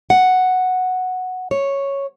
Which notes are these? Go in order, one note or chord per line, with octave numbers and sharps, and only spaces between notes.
F#5
C#5